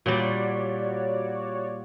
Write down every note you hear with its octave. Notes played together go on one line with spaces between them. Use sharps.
A#2 G3 F#4 C#5 D5